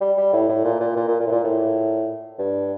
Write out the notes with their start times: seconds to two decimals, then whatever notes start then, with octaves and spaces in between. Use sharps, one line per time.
0.01 G3
0.17 G3
0.33 A2
0.49 A2
0.64 A#2
0.80 A#2
0.96 A#2
1.08 A#2
1.20 A#2
1.26 A2
1.32 A#2
1.44 A2
2.39 G2